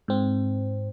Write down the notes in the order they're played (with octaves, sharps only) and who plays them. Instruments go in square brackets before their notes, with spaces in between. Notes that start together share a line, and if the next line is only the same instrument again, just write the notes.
[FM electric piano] G#2 C4